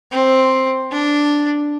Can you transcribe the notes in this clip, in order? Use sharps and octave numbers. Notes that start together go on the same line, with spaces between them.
C4
D4